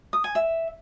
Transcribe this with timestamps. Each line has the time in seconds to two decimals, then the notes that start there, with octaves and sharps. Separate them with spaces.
0.13 D#6
0.24 G#5
0.35 E5